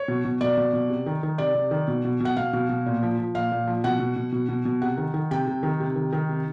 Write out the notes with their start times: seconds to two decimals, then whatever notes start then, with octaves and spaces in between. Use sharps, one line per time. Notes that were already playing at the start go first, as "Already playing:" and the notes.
Already playing: C#5
0.08 B2
0.25 B2
0.41 B2 D5
0.57 B2
0.73 B2
0.90 C3
1.06 D#3
1.23 D#3
1.38 C3 D5
1.55 C3
1.71 D#3
1.88 B2
2.05 B2
2.20 B2 F#5
2.37 B2 F5
2.53 B2
2.69 B2
2.86 A#2
3.03 F3
3.18 F3
3.35 A#2 F5
3.52 A#2
3.68 F3
3.84 B2 F#5
3.99 B2
4.16 B2
4.32 B2
4.49 B2
4.65 B2
4.82 C3 F#5
4.98 D#3
5.14 D#3
5.31 C3 G5
5.47 C3
5.63 D#3
5.80 C3
5.96 D#3
6.13 D#3
6.29 C3